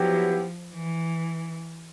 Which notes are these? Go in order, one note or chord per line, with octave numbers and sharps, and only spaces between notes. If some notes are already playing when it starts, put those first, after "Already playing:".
Already playing: F3 F#3 B3 E4 G4
E3